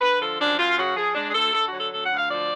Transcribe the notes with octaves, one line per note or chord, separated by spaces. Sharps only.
D3 B4
F3 A4
F#2 D4
F#2 F4
C#3 F#4
F3 G#4
G#3 D4
G#4
D2 A4
D3 A4
F#4
F#3
A4
D2 A4
F#5
D2
F5
F3 D5